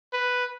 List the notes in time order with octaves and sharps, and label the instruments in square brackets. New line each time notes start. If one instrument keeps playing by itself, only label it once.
[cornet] B4